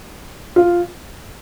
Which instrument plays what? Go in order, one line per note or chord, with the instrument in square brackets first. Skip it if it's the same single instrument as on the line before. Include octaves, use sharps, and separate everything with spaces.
[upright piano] F4